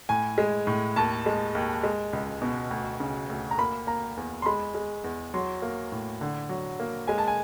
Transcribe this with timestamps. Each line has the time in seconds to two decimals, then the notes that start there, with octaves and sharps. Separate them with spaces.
0.09 A2 G#5
0.38 G#3
0.67 A2
0.96 D#2 A5
1.26 G#3
1.55 D#2
1.83 G#3
2.13 C#2
2.42 B2
2.71 D2
3.00 C#3
3.30 D2
3.51 A#5
3.58 A#3 B5
3.87 A#3 A#5
4.17 E2
4.42 C6
4.46 G#3 B5
4.75 G#3
5.04 E2
5.34 F#3 C6
5.62 A#3
5.92 A2
6.21 D3
6.49 F#3
6.80 A#3
7.08 G#3 G#5
7.18 A5
7.28 G#5